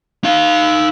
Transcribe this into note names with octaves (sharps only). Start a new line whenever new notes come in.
D#4 F5